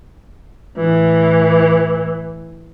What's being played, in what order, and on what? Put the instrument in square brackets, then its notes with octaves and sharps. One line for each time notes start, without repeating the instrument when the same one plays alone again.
[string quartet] A2 E3